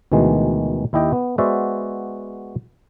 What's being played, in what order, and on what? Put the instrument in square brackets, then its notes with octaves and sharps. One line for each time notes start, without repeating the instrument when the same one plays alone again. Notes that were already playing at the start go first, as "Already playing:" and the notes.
[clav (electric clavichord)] D2 B2 D#3 E3 G#3
D#2 E4 G4 D#5 G5
B3
G#3 B3 F#4 C5 D5 E5